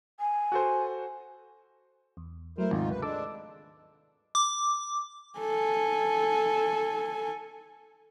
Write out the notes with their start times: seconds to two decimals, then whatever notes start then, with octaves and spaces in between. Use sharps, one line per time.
0.20 G#5
0.52 F#4 A4 C5
2.17 E2
2.58 F#3 A3 E4 A#4 C5
2.71 G#1 D#2 C#3 D#4 F4
2.90 C3 B4
3.02 G#3 D4 A4 D6 E6
4.35 D6
5.40 A4 G#5